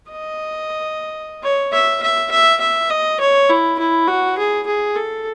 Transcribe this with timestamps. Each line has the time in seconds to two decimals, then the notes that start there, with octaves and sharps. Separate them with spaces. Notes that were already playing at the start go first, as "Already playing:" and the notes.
0.11 D#5
1.43 C#5
1.73 E5
2.02 E5
2.31 E5
2.61 E5
2.90 D#5
3.20 C#5
3.49 E4
3.79 E4
4.07 F#4
4.38 G#4
4.67 G#4
4.96 A4